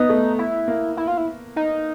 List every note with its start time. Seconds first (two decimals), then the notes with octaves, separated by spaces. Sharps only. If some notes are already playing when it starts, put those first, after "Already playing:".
Already playing: B3 D#4
0.09 A3
0.39 E4
0.68 A#3
0.97 E4
1.07 F4
1.18 E4
1.56 D#4